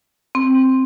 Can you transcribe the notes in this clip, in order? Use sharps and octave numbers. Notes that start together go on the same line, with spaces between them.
C4